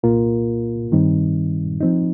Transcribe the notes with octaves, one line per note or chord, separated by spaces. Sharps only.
C2 A#2 A#3 F4 A#4
G2 D#3 G3 C4 D#4
F3 C4 D#4